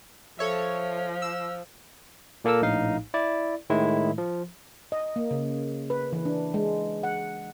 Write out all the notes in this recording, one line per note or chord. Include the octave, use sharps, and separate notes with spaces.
F3 A4 C#5 E5
E6
A#2 A#3 A4 A#4 E6
A#1 A2 D#4 F5
E4 D5
A2 D#3 G#3 E4
F3
D#5
A#3
C#3
B4
E3
D4
G#3
F#5